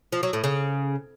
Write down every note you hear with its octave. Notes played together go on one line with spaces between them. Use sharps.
F3
F#3
A2
C#3